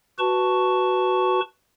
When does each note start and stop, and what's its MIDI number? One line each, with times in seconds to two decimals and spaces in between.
0.19 1.40 66
0.19 1.40 71
0.19 1.40 81
0.19 1.40 85